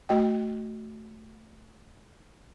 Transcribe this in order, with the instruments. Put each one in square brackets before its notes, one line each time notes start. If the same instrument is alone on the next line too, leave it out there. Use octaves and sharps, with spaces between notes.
[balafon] A3 F#4 D#5 G5